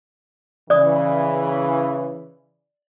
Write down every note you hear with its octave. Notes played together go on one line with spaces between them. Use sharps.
C#3 E3 D5 D#6